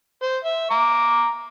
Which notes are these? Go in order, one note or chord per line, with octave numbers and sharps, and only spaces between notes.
C5
E5
A#5 D6